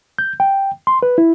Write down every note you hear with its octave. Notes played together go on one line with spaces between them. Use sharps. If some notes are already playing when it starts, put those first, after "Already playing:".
G6
G5
C6
B4
E4